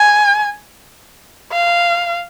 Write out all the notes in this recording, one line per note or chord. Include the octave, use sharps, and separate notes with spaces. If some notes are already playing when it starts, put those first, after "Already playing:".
Already playing: G#5
F5